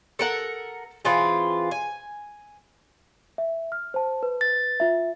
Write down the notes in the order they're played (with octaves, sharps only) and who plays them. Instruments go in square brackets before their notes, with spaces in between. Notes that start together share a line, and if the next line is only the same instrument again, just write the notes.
[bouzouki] A4 A#4 F#5
E3 C4 F4 G#4
G#5
[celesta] E5
F6
C5 A5
B4
[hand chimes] A6
[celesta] F4 E5